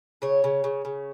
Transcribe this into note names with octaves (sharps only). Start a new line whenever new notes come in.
C#3 C#5
C#3
C#3
C#3